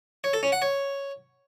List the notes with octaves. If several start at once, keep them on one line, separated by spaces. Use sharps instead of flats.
C#5
A4
C#4
F#5
C#5